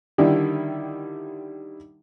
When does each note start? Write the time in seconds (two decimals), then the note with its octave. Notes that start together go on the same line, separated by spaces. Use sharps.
0.18 D3 D#3 G3 E4